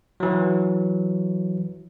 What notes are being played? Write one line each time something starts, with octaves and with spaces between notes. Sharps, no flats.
E3 F#3